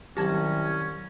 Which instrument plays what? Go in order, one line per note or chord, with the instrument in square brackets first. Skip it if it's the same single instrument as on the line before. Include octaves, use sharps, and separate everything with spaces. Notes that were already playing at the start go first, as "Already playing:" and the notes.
[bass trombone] C2 [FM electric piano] D#3 F#3 A#6 [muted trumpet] C#4 [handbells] G4 A5 G#6